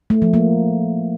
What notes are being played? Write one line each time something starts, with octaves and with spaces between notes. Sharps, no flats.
A3
F3
A#3